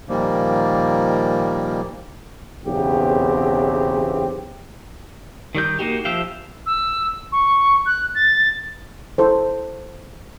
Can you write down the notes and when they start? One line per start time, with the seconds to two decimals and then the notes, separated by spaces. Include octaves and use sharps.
0.09 A#2 D#3 F3 G3 A#3
2.65 B1 E2 C#3 C4 G4
5.55 D#3 G3 D#4 G6
5.79 A#3 D#4 F#4 G4
6.05 F3 G4 E5 F5 G5
6.66 E6
7.32 C#6
7.85 F#6
8.14 A6
9.18 E4 A4 C5